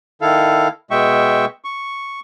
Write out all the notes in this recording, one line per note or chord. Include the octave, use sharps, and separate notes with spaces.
D#3 E4 A4 F5
B2 G#3 E5 G5 C#6
C#6